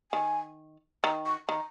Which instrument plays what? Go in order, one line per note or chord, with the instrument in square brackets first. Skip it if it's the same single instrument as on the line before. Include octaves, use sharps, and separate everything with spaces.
[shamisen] D#3 [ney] G#5
[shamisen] D#3 [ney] A#5
[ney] C#6
[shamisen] D#3 [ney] A#5